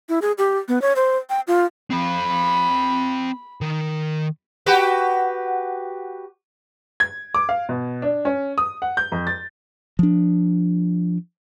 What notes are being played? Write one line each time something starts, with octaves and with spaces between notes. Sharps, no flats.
E4
G#4
G4
B3
C#5
C5
G5
F4
C4 F5 B5
D#3
F#4 G4 B4
G#6
D6
F5
B2
D4
C#4
D#6
F#5
G6
F2
A6
F3 D4